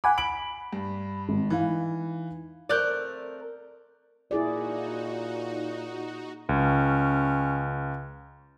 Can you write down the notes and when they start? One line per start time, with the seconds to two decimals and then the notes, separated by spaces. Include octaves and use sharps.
0.04 F#5 G#5 B5 D6
0.18 B5 D7 F#7
0.73 G2
1.29 G#1
1.50 E3 D#4 E4 F5
2.69 A3 C4 A#4 D5 F#6 G6
4.31 A#2 D#4 E4 F#4 G#4 D5
6.49 C#2 C#4